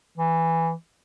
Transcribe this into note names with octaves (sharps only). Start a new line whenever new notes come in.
E3